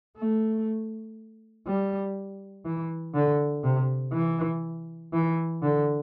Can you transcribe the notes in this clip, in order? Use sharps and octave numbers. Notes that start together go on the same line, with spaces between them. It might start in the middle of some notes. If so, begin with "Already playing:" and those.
A3
G3
E3
D3
C3
E3
E3
D3